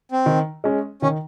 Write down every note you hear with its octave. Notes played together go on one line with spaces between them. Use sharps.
C4
D#3
G#3 C#4
D#3 C#4